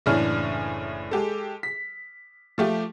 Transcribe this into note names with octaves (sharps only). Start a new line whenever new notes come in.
F#1 A2 E3 D4 C#5 F6
G#3 G4 A4
B6
F3 A3 G4